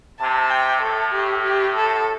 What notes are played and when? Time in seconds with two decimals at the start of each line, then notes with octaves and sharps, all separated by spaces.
0.19 C3 A5
0.50 G5
0.81 A2 A4
1.14 G4
1.44 G4
1.76 A4